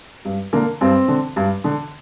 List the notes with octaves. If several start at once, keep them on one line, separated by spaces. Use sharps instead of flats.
G2
D3 A#3
G2 C4
D3
G2
D3